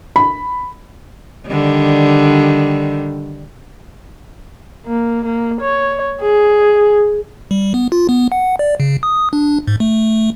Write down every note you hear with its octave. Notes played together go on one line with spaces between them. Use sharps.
B5
D3 D#3 G3
A#3
A#3
C#5
G#4
G3
B3
F4
B3
F#5
D5
C#3
D#6
D4
G#2
A3